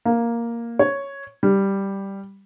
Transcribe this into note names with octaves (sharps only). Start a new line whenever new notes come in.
A#3
C#5
G3